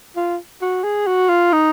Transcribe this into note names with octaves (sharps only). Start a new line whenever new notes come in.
F4
F#4
G#4
F#4
F4
D#4